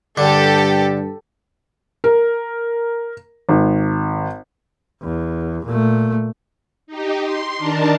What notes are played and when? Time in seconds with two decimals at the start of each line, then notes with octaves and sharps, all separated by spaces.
0.17 G2 D3 G4 A4
2.04 A#4
3.49 G#1
5.03 E2
5.66 A#2 A3
6.87 D#4 G4
7.22 C6
7.58 D#3 D4 A#4 A5